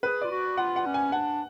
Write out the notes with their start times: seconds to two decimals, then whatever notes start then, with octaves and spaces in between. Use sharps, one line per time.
0.03 G#4 B4
0.21 F4 D5
0.31 F#4
0.57 F4 F#5
0.76 F#5
0.86 C#4
0.94 G#5
1.12 D4 F#5